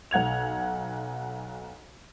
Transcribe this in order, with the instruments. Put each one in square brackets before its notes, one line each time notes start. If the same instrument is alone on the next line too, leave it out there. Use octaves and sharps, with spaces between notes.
[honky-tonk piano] B1 F#5 G#6 F7